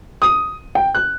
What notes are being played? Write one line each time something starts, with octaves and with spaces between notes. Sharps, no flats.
D#6
G5
F#6